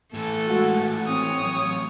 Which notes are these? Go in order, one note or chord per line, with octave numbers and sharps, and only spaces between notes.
A2 E3 A3 A4
G#3 F#4
C4 C#5 D#6
F#3